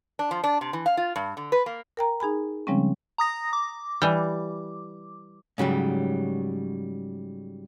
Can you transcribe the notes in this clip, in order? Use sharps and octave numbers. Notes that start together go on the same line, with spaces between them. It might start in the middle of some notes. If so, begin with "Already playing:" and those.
D4
F3
D4
C3
E3
F5
F4
G2
D3
B4
A#3
A#4 G5 A#5
D#4 G#4 G#5 B5
C#3 F3 G3 G#3 C4 C#4
A#5 D#6 A#6
D6
E3 G3
G#2 C#3 F#3 G3